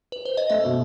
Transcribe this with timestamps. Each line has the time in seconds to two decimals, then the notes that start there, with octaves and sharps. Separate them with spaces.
0.12 B4
0.25 C5
0.37 D#5
0.50 A3 E5
0.65 B2